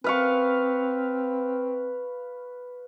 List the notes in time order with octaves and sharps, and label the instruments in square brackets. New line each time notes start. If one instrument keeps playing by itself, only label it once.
[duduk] C4 [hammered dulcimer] B4 F5 C#6